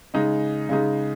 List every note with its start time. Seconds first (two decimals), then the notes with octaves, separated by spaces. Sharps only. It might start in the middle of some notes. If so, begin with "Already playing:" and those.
0.14 C#3 G#3 D#4
0.69 C#3 G#3 D#4